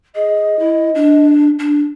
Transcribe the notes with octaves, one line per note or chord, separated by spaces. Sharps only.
G#4 D#5
E4
D4
D4